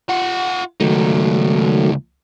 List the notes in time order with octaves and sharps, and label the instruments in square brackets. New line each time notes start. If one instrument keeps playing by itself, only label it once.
[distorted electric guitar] F4 F#5
[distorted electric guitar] C#2 D#4 [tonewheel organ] D#3 F#3 A3